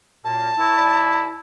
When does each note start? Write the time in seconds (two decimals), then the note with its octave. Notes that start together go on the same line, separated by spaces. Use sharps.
0.24 F#2 A#2 A#3 A5
0.59 E4 A#4 C#5
0.77 D#2 D5 B5